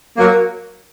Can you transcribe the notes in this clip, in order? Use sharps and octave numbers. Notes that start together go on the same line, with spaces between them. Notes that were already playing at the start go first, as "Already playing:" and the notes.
F#3 A#3